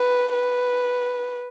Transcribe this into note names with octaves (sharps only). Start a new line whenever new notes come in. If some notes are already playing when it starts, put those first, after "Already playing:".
Already playing: B4
B4